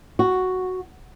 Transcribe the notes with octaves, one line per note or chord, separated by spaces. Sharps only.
F#4